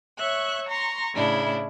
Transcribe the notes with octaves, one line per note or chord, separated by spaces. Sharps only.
C#5 E5 C#6 F#6
A#5 C6 C#6
A2 C#3 D4 E4